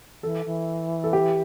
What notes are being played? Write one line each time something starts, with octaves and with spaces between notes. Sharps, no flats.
E3 A4
E3
A4
G4